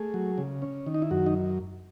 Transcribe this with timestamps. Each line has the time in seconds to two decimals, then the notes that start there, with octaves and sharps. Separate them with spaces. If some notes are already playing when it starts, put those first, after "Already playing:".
Already playing: A3 G#4
0.14 F#3
0.38 C#3
0.62 C#4
0.87 D#3
0.94 D#4
1.02 E4
1.11 F#2 F#4
1.26 D#4